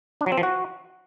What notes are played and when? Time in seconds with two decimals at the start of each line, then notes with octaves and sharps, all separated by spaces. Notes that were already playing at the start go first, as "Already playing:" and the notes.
0.21 D4
0.26 F#3
0.32 C4
0.38 F3
0.43 F#4